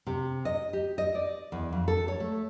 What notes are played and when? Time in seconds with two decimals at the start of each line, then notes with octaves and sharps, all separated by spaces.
0.07 C3
0.45 D#5
0.73 G4
0.98 D#5
1.15 D5
1.52 E2
1.73 F2
1.88 A4
2.08 C#5
2.20 A3